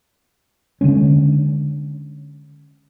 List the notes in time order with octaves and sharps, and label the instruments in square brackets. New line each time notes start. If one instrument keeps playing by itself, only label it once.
[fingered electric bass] D3 D#3 G#3 C#4